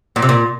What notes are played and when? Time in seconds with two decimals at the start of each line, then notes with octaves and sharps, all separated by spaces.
0.16 A#2
0.22 C3
0.29 A#2